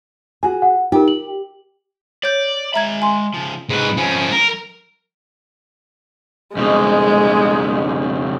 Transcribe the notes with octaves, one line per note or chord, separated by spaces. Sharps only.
F#4 G#4 G#5
F#5
D#4 F4 G4 A#4
F#7
C#5 D5 G6
G#3 E5 A#5 B5 G#6
G#5 C6
C#3 F3
G#2 B4
F3 C#4
A#4
F2 B2 G#3